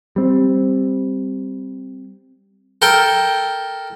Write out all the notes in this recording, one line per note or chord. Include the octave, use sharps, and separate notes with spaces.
G3 C4
A4 A#4 G5